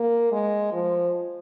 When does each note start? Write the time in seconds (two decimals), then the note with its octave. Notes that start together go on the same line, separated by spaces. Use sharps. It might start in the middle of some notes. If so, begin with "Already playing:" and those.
Already playing: A#3
0.32 G#3
0.73 F3